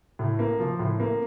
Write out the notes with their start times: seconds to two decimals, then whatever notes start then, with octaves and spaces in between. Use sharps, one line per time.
0.19 A2
0.39 A#3
0.60 F3
0.79 A2
1.00 A#3